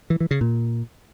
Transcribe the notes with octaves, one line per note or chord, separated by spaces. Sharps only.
E3
E3
C#3
A#2